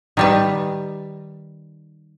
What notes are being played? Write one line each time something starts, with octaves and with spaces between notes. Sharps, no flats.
D#3 G3 B4